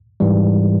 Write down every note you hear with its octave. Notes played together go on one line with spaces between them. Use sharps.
G#2 E3 G3